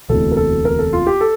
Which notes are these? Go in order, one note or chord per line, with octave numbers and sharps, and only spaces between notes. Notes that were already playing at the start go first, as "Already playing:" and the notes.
E1 D2 C3 E3 A4
A#4
A4
A#4
A4
F4
G4
A4